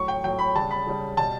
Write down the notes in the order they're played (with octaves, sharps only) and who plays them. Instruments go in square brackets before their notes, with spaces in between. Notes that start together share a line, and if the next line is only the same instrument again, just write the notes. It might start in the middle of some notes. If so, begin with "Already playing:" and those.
Already playing: [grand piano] A2 F#3 C#6
G5
A2 F#3 G5
B5
C#3 G3 A5
B5
C#3 G3
B2 G3 A5